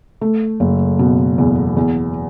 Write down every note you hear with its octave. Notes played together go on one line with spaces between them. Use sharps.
A3
F#1
B2
E2
E2